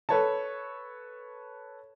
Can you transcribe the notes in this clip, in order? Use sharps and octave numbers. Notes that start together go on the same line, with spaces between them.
A4 B4 C#5 A5